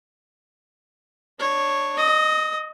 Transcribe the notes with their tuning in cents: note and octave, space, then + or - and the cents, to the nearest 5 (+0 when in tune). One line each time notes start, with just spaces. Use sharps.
D4 +20 C#5 -5
D#5 -10 D#6 +35